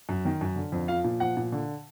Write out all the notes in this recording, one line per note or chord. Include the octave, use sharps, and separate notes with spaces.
F#2
D#3
F#2
D3
F2
F3 F5
A#2
F3 F#5
A#2
D3